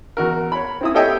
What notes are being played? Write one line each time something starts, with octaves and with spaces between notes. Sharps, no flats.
E2 F#4 A#4
C#5 B5
C4 E4 D#6
G4 A4 C#5 D#5 E5 G5